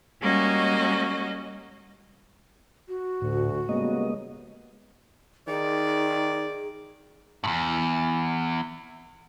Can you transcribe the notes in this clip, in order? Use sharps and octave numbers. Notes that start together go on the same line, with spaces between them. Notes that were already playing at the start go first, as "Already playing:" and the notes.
G3 G#3 A#3 C#4 F#4 D#5
F#4
D2 A2
C#3 G3 G#3 A#3 B3 D#5
D#3 D#4 G#4 D5
E2 G2